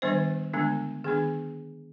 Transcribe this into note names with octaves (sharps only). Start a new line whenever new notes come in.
D#3 G3 B3 D4 C5
D3 G#3 B3 D4
D#3 B3 D4 G#4